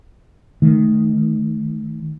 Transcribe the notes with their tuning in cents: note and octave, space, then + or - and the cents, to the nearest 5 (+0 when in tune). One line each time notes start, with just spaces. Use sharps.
D#3 -5 A3 -20